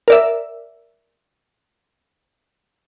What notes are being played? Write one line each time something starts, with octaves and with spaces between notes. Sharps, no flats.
A#4 D5 E5